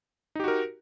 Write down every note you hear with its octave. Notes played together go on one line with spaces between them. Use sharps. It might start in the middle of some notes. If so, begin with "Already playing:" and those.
D#4 F#4 G4 A#4